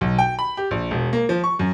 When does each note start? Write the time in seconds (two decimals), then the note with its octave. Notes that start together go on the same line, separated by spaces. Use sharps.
0.01 B1
0.19 G5
0.39 B5
0.57 G4
0.71 A#1
0.91 E1
1.13 A#3
1.29 F3
1.44 C#6
1.59 F#2